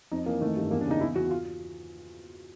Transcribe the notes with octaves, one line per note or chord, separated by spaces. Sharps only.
F2 D#4
E3 A#3
D#3 A3
G2
E2 A#3
D4
C#3
D#4
E2 E4
E2 F#4
F4